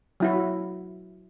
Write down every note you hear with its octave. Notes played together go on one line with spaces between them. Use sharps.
F#3 E4 F#4